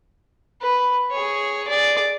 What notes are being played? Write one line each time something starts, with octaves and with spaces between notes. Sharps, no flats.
B4
G#4 C#5
G#4 D5